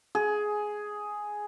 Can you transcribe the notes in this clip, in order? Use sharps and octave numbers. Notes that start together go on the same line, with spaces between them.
G#4